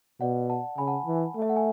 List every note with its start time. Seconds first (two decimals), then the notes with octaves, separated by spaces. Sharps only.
0.20 B2 D5 F#5
0.50 F#5 A5
0.78 C#3 G#5 B5
0.88 F#5 A5
1.06 E3
1.36 A3
1.42 E5
1.49 F#5
1.56 G#5